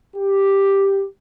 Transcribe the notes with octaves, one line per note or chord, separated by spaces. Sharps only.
G4